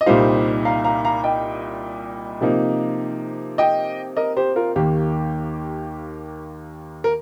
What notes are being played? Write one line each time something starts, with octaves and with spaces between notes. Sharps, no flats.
D#5
C2 A#2 G3 D#4 C5 F5
F5 A#5
F5 A#5
F5 A#5
D#5 G5
C3 F3 A#3 D#4
D#5 G5
A#4 D#5
G4 C5
F4 A#4
D#2 D#3 A#3 G4
A#4